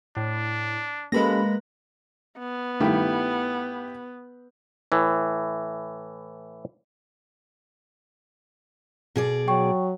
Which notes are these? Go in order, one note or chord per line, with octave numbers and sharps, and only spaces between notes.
A2 D4
G#3 A#3 C#4 G4 A4 B4 B5 A#6
B3
G2 D#3 A3 E4 G4
A2 E3
B2 G#4 D5
F#3 G5 C#6